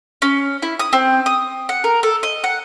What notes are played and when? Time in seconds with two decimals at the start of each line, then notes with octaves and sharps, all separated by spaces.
0.22 C#4
0.62 E4
0.79 D#6
0.93 C4
1.26 D#6
1.69 F#5
1.84 A#4
2.03 A4
2.23 D#5
2.44 F#5